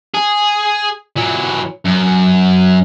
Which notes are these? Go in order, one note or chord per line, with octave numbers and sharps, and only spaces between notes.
G#4
E3 F#3
F#2